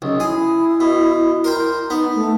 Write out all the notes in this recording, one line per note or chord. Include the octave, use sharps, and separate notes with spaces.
B1 C#3
E4 G#4
B2
A#4 C5 G5
B3 D#4
A3